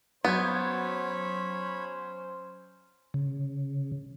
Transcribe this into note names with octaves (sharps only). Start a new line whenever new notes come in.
F#3 B3 C#4 C5 C#5 B5 G6 G#6
C#3